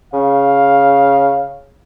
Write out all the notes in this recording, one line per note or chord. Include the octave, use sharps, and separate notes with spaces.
C#3 F5